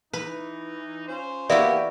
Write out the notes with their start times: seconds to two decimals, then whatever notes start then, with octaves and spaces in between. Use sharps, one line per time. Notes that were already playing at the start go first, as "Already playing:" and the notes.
0.13 E3 D#4 B4
1.08 C#4 F4 C5
1.49 A#3 B3 E4 F#4 G4 D5 E5